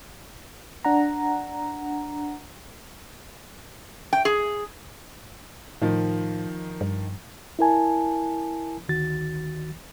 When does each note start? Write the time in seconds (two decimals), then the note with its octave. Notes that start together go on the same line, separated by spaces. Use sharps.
0.85 D4 F#5 A#5
4.13 G5
4.25 G#4
5.82 A2 D#3 F3
6.81 G2
7.59 E4 A#4 G#5 A5
8.89 D2 D#3 F#4 A6